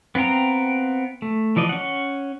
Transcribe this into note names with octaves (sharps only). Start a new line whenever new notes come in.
B3 C4 F5 G5 A#5
A3
E3 F3 D5 D#5
C#4 F#5